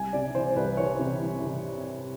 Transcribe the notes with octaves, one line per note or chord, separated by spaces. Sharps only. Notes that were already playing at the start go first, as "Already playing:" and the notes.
Already playing: C2 G#5
C3 D5
E3 C5
C2 B4
E3 C#5
C3
E3
C3